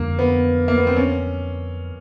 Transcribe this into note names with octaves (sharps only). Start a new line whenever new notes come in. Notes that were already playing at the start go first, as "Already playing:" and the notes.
Already playing: F2 D3 G3 A#3
B3
A#3
B3
C4
C#4